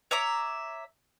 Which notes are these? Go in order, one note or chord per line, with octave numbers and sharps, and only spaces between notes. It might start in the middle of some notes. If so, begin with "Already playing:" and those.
C#5 E5 A#5 D6